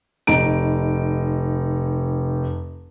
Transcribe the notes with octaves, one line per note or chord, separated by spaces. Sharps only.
F1 D#4 D7